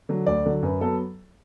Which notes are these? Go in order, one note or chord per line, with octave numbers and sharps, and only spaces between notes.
D3 F#3
D2 D5
D3 F#3
F#2 B4
F#3 B3 A4